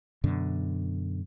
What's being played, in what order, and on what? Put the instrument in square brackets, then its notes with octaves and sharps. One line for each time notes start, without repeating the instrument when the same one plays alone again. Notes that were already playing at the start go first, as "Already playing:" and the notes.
[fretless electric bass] F#2 B2 D3